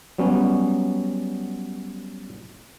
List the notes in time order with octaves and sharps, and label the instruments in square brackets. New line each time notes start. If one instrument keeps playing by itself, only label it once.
[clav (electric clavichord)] F#3 G3 B3 C#4